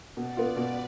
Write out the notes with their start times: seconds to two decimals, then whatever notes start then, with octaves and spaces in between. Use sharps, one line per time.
0.17 B2 D5
0.37 B3 F4
0.56 B2 B4